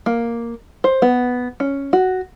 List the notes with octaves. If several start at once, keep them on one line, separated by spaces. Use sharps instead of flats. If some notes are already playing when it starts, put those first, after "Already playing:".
A#3
C5
B3
C#4
F#4